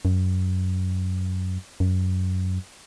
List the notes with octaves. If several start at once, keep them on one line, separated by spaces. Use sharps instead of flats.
F#2
F#2